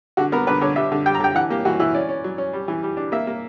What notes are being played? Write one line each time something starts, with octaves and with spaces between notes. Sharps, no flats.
D3 F#4
B3 A#4
D3 B4
D3 C#5
G3 E5
D3
G3 G5
A#5
D3 G5
E3 F#5
A#3 G4
E3 F#4
E3 E4
C#4 D5
C#4
F#3
C#4
G3
E3
G3
D4
A#3 E5
A#3